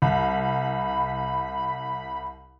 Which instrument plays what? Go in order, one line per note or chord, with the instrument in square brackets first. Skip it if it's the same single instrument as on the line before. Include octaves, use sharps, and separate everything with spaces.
[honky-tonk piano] C2 [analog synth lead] B5